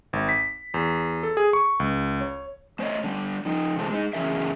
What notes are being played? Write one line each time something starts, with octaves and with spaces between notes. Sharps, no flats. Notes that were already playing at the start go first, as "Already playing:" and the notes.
G#1
B6
E2
A4
G#4
C#6
C#2
C#5
A3 C5 C#5 D#5
D3 G3
F3 D#4
C3 E3 G#3 A4 C5
G#3 D#4
F#2 C#3 E3 G#4 A#4 E5